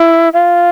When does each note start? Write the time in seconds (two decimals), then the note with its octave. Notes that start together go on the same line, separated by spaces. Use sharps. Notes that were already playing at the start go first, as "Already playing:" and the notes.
Already playing: E4
0.34 F4